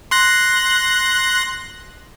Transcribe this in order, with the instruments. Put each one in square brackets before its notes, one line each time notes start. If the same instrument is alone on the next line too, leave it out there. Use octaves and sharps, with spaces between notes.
[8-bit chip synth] C6 F#6 A#6